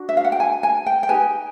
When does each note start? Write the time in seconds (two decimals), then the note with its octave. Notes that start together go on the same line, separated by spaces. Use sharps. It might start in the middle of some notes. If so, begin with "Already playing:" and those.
Already playing: D4 F#4
0.09 E5
0.17 F5
0.25 F#5
0.32 G5
0.40 G#5
0.63 G#5
0.86 G5
1.03 G5
1.09 D#4 G4 B4 G#5